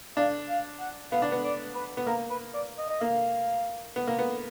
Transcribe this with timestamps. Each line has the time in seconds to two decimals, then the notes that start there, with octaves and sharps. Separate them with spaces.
0.17 D4 F5
0.49 F5
0.80 F#5
1.12 B3 F5
1.22 D4
1.32 B3
1.44 D5
1.75 B4
1.97 B3
2.07 A#3 A#4
2.30 B4
2.54 D5
2.78 D#5
2.89 D#5
3.01 A#3 F5
3.96 B3
4.07 A#3
4.19 B3